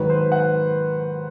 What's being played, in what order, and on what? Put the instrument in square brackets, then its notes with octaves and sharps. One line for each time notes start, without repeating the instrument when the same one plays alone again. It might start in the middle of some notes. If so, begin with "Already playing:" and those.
Already playing: [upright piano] G#2 D#3 F#3 B4
C5
F#5